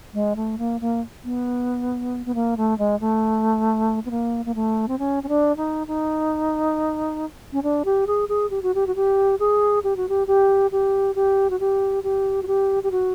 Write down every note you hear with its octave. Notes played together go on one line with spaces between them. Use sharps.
G#3
A3
A#3
A#3
B3
B3
A#3
A3
G#3
A3
B3
A#3
A#3
A3
C4
C#4
C#4
D4
D#4
D#4
C#4
D4
G4
G#4
G#4
G4
F#4
G4
F#4
G4
G#4
G4
F#4
G4
G4
G4
G4
F#4
G4
G4
F#4
G4
G4
F#4